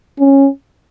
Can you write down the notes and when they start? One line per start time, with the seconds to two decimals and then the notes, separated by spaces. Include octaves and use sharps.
0.20 C#4